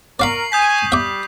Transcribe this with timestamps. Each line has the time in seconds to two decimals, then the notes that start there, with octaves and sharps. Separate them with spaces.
0.20 A#4 D5 F5 B5 C#6 C7 F#7
0.52 G#5 D#6 G6 B6
0.92 G3 E5 D6